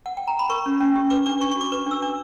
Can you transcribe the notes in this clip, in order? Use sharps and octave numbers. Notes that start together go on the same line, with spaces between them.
F#5
G5
A#5
B5
A#4 C#6
C#4
C#4
G4
B4 D6
D4 D6
D4 C#6
C#6
F#4
D6
B4 D6
D4 E6
D4 D6